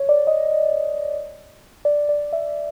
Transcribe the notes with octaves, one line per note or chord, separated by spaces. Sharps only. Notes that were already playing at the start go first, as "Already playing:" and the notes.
Already playing: C#5
D5
D#5
D5
D5
E5